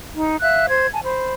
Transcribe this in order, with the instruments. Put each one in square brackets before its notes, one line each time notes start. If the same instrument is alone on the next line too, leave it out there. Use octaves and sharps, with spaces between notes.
[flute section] D#4
E5 F5 F#6
C5 G#6
G#5 A5
C5 B5